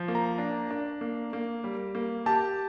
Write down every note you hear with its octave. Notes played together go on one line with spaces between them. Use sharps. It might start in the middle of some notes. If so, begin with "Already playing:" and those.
Already playing: F3
A#3
A#5
D4
D4
A#3
A#3
G3
A#3
G4 A5